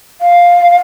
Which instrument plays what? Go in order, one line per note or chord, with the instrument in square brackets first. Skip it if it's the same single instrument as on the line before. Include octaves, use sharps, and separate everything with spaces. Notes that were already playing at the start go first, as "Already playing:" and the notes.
[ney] F5